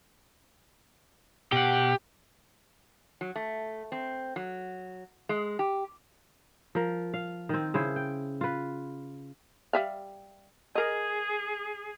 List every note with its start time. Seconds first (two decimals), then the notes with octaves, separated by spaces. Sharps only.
1.52 B2 G4 F#5
3.21 F#3
3.36 A3
3.92 C4
4.36 F#3
5.29 G#3
5.59 G4
6.75 F3 A#4
7.14 F5
7.49 D#3 C4
7.74 C#3 E4 C5
7.96 G5
8.41 F4 B4
9.73 G3 E5 F5
10.75 G#4 A#4 D#5